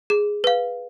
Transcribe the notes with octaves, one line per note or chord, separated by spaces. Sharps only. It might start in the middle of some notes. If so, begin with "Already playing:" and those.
G#4
B4 F5